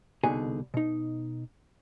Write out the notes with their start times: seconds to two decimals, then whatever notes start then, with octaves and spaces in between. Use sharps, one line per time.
0.24 C2 B2 D3 D#4 G#4 G#5
0.74 B2 D#4